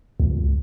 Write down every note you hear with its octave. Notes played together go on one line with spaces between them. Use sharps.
C#2